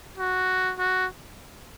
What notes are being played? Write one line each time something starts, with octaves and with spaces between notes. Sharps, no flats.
F#4
F#4